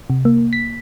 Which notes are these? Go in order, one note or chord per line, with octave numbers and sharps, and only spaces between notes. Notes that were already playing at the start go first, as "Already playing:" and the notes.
C3
A#3
B6